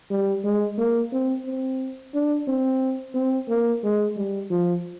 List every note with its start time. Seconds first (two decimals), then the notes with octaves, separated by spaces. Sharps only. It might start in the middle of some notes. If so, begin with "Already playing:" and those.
0.11 G3
0.44 G#3
0.78 A#3
1.13 C4
1.46 C4
2.14 D4
2.48 C4
3.15 C4
3.49 A#3
3.84 G#3
4.17 G3
4.51 F3